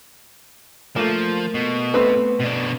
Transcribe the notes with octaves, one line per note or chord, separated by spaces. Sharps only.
F3 A3 A#3
B2
A3 C4 B4
B2 D4